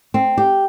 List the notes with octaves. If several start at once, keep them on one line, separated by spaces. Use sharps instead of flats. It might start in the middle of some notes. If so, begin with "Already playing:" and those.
C4
G4